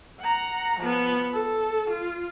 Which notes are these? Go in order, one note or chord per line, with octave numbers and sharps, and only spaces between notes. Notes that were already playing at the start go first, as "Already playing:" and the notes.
F#5 A#5
F3 B3
A4
F4